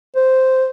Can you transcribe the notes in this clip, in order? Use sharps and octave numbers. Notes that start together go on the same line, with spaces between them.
C5